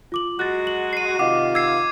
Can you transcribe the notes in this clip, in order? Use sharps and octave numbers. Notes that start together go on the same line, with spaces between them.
F4 D6 F#7
F#3 G#3 F#4 F#6 A6
F#7
C7 D#7
C3 D#3 F4 D#5 F#5 D6
E6 G#6 C7